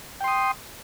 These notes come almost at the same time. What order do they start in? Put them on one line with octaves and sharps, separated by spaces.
G5 C6 D#6